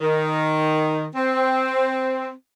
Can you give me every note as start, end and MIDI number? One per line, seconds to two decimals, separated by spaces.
0.01 1.06 51
1.15 2.30 60